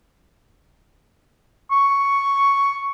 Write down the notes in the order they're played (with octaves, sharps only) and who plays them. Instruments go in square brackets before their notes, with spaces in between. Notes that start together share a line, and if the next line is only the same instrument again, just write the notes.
[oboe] C#6